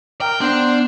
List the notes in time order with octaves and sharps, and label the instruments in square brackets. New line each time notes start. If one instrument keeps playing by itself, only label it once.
[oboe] A#4 [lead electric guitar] G5
[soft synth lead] B3 [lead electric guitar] D4 [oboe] C5